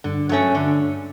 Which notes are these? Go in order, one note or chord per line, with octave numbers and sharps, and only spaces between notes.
G2 D3
F#3 A3 C#4
D3